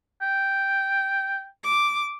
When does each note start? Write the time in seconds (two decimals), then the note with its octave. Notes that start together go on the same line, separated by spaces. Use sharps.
0.22 G5
1.63 D6